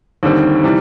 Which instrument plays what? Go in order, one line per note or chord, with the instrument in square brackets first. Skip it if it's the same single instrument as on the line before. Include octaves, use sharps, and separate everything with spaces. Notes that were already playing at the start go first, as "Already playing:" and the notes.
[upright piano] D#2 D3 G3 C4 [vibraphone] D#4
[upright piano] C3 E3 G3